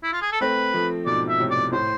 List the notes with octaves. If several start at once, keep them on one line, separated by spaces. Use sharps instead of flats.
E4
F4
G#4
A4
A3 C4 B4
F3 A3
G#2 B2 D5
E5
A2 C3
D5
A2 C5